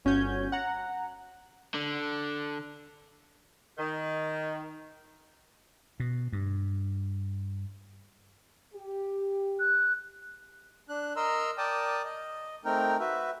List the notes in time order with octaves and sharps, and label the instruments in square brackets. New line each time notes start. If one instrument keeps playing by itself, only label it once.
[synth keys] G1 C#4 F#4 G6 G#6
F#5 A#5
[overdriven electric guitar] D3
[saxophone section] D#3
[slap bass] B2
G2
[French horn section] G4
[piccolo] F#6
[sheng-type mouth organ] D4 F#6
A#4 D#5 A#5 C6 E6
A#4 D5 G5 A5 D6 D#6
D#5
A3 C4 D#4 A#4 G5
F#4 B4 E5